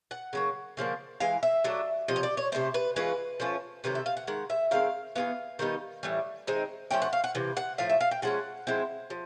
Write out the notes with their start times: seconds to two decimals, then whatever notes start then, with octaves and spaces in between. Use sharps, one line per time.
0.11 F#5
0.33 C#3 F#3 A#3
0.77 C#3 F3 A#3 D4
1.20 E3 G#3 F5
1.43 E5
1.64 F#3 A3 D4
2.08 C3 F3 D#5
2.16 C#5
2.23 D5
2.37 C#5
2.52 C3 F3 A3 C5
2.74 B4
2.96 E3 G#3 C#4 F4 B4
3.40 F3 A3 C#4 F4
3.84 C3 D#3 F#3 A3 B4
3.95 E5
4.06 F5
4.17 F#5
4.27 D#3 G#3 F#5
4.50 E5
4.71 D#3 G#3 C4 F5
5.15 E3 G#3 B3 F5
5.59 D#3 G3 B3 D#4
6.03 A2 E3 G3
6.47 D#3 G#3 C4 D#4
6.91 F3 A3 C#4 G5
7.02 F#5
7.13 F5
7.24 F#5
7.35 C3 E3
7.57 F#5
7.78 A2 F3 A3 F5
7.89 E5
8.01 F5
8.11 G5
8.22 F3 G#3 C#4 F#5
8.67 F3 G#3 C4 E4
9.10 F3